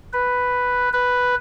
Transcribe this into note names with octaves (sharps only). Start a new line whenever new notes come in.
B4
B4